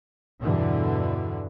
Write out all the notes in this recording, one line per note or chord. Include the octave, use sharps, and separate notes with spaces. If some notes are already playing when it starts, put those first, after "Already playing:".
E2 G2 B2 D3 E3